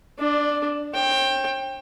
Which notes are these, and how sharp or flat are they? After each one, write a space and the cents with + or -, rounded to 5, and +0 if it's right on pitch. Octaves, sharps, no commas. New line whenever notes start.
D4 +0 D5 +30
C#5 -45 G5 +10